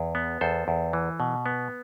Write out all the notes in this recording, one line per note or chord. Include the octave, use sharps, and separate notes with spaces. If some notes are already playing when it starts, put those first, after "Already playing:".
Already playing: E2
B3
E2 A4 C5
E2
E3
B2
B3